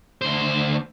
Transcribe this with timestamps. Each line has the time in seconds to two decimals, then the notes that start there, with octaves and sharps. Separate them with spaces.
0.22 D2 C5